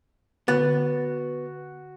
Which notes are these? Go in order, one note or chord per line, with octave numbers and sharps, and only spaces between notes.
D3 B3 F#4 F#6 A6